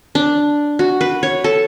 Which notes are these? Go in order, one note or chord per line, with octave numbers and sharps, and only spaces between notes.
D4
F#4
B4
C#5
A4